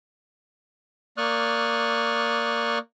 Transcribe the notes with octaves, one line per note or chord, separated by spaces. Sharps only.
A#3 D5 C#6 D#6 F6 F#6